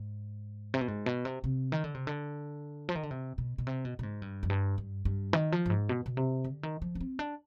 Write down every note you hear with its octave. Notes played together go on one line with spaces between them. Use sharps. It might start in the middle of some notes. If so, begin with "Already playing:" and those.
Already playing: G#2
C3
B2
G#2
B2
C3
C3
D#3
D3
C3
D3
F3
D#3
D3
C3
B2
B2
C3
B2
B2
G#2
G2
F2
G2
G2
G2
D#3
F3
G2
G#2
B2
B2
C3
D3
D#3
F3
D4
C4
D4